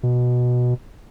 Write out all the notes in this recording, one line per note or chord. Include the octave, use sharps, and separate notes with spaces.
B2